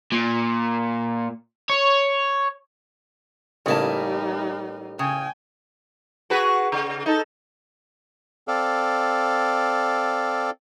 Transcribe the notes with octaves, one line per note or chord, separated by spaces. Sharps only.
A#2
C#5
A1 C#3 G3 A#3 D#4 E4 A5
C#3 G5 G#5
F#4 G#4 B4
C#3
D#4 A4
C4 A4 D5 F5